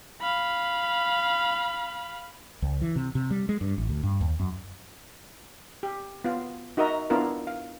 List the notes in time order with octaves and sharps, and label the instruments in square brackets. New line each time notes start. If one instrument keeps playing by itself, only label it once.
[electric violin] F5 B5
[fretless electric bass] C#2
E3
C3
C3
G3
G#3
G2
A1
D2
G2
D#2
F#2
[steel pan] G4
B3 F4 F5
D#4 F#4 A#4 D#5 E5 A#5
B3 D4 E4 F4 A#4
F5